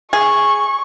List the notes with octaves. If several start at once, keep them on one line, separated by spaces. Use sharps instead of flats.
G#4 C#6